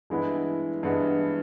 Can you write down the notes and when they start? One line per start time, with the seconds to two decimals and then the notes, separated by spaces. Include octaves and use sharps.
0.10 G2 E3 G#3 B3 E4
0.83 G2 E3 G#3 B3 E4